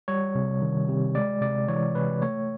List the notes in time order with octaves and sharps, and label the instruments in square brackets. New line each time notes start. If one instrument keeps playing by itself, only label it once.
[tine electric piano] G3 C#5
C3
D#3
C3
G#3 D5
C3 D5
E3 C#5
C3 B4
A3 C#5